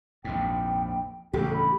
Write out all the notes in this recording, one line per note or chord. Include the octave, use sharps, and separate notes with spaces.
A#1 F2 G#2 G5
A1 D2 C#3 G4 A4
B5